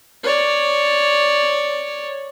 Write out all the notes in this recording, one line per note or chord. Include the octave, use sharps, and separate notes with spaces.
C#5 D5